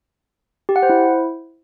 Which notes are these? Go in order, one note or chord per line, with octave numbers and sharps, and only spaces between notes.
G4
F#5
C5
E4